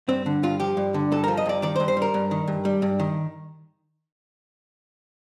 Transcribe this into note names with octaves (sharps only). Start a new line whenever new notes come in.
G2 C4
D3
G2 F4
F3 G4
G2
D3
G2 A4
A#4
F3
D#5
G2 D5
D#3 D5
C5
G2
C5
G3
A#4
G2
D#3
G2
G3
G2
D#3